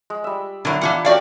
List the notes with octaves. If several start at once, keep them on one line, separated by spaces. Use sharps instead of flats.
G#3
G3 E5
D3 F#3 E4 A#4
E3 A#3 D4 F4 F#5
A3 C#4 F#4 G4 D5 F5